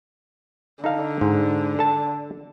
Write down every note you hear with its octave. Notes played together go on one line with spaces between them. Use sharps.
D3 D#4 A4 F5
G#2
A4 A5